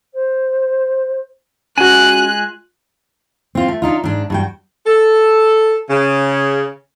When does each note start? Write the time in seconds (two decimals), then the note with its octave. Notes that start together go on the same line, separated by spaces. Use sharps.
0.13 C5
1.78 G#3 C#4 F4 F#4 G#5 F#6
3.55 C4 F4
3.68 A3
3.82 D4 D#4 F4
4.04 G#2 D4
4.30 G2 F#4 G5
4.86 A4
5.89 C#3